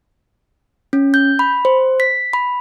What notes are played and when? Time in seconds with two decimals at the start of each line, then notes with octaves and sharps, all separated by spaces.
0.93 C#4
1.14 G6
1.39 B5
1.65 C5
2.00 B6
2.33 B5